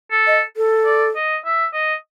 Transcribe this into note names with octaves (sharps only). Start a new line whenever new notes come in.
A4
D#5
A4
D5
D#5
E5
D#5